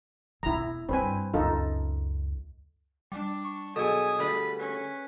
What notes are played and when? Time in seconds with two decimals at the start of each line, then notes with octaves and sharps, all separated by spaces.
0.43 E1 C4 E4 A#5
0.89 G2 C4 B4 G#5
1.34 C#2 F#2 D#4 F4 A4
3.12 G3 D4
3.44 C#6
3.76 B2 F#3 G#4 A4 G#5 C#6 D#6
4.19 D2 G3 B4
4.58 C#4 B4